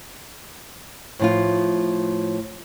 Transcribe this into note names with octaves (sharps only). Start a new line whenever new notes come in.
A2 F3 F4